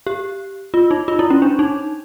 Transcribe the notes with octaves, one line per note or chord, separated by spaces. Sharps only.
G4
F4
D#4
F4
E4
C#4
D4
D#4